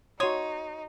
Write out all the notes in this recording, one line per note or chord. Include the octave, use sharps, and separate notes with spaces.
D#4 F#4 C#5 C6 D#6